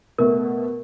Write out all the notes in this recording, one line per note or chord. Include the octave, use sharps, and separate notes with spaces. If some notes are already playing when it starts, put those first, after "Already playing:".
B2 A3 B3 A#4